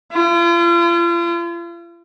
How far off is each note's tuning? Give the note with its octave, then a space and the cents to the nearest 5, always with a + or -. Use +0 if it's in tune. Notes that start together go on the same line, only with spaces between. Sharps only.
F4 -40